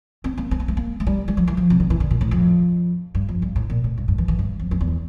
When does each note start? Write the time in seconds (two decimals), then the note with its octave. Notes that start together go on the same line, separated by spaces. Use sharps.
0.24 C4
0.37 A#3
0.51 C4
0.60 A#3
0.68 A3
0.77 A#3
1.00 A3
1.07 G3
1.28 G3
1.37 F3
1.48 E3
1.57 F3
1.70 C3
1.80 D3
1.90 E3
2.00 D3
2.11 A#2
2.21 A2
2.31 F2
3.15 G2
3.29 F2
3.42 G2
3.56 A2
3.70 A#2
3.84 A2
3.98 G2
4.08 G2
4.18 E3
4.28 E3
4.39 G2
4.60 F2
4.71 F2
4.81 E2